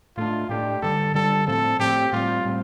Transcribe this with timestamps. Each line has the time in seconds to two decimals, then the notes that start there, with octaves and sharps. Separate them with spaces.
0.17 A2 A3 D4 F4
0.49 A2 A3 D4 G4
0.82 G2 D3 G3 A4
1.14 G2 D3 G3 A4
1.47 A2 F3 C4 A4
1.79 A2 F3 C4 G4
2.12 A2 G3 C4 F4
2.45 A2 G3 C4